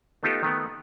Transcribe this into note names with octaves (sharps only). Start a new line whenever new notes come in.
A3 B3 D#4 F4 G4 A4
D#3 A3 B3